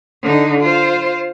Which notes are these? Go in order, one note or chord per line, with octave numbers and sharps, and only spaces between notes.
D3 D#4
F4 C5